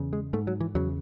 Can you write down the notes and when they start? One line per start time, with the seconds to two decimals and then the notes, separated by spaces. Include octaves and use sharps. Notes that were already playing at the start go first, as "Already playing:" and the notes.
Already playing: E2 C#3
0.13 G#3
0.33 G#2 A3
0.47 F#3
0.60 E3
0.75 E2 C#3 F#3